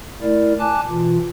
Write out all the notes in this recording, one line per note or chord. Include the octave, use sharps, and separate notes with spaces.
A3 E4 A#4 D5
G#5 A5 D6 F#6
B2 E3 F4